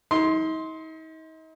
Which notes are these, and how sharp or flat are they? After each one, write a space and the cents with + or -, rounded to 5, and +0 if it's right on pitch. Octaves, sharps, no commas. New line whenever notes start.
D#4 +40 C6 +0